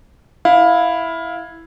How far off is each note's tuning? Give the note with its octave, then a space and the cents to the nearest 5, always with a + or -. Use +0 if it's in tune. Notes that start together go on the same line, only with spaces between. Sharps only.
E4 +0 F5 +15